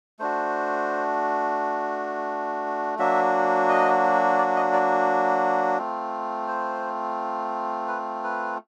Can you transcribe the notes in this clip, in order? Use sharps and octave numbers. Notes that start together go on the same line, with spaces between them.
A3 D4 F#4 C5
F#3 A#3 D4 F#4 E5
D#5
D5
D#5
D5
A3 C4 F4
C5
B4
B4